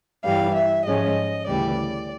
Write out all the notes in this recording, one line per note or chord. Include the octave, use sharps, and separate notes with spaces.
G2 E3 G3 F5
E5
G#2 F3 G#3 C#4 D#5
D2 C#3 E3 G3 D5